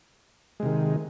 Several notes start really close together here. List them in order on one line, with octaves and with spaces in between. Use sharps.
G#3 C3 D#3